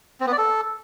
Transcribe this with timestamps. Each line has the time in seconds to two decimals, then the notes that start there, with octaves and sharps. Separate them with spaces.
0.21 C4
0.26 B3
0.32 D5
0.38 A4